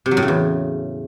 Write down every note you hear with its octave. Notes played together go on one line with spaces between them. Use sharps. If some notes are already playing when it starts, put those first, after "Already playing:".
C3
F#3
A2
C#3
E2